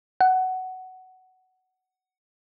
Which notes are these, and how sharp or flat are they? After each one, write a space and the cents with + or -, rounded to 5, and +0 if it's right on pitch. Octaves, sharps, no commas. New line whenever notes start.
F#5 +10